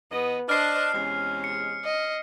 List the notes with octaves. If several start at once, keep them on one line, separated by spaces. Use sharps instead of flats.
E2 B3 D#5
D4 C5 D#5 F6 C7
E2 C3 G#3 C#4
C#7
D#5